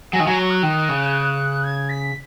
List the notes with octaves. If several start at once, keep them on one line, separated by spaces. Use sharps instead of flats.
F#3 G#5
D#3
F#3 G#5
C#6
F#6
D#3
C#3
G#6
B6